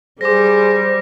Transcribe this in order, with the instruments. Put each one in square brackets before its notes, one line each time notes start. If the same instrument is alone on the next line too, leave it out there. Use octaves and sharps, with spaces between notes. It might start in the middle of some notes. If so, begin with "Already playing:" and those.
[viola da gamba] G3 [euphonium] G#4 [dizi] C5 [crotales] D6 A#6